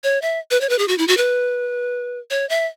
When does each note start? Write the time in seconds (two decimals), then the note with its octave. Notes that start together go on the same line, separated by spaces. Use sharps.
0.04 C#5
0.22 E5
0.51 B4
0.61 C#5
0.69 B4
0.79 G#4
0.88 F#4
0.98 E4
1.08 F#4
1.17 B4
2.30 C#5
2.49 E5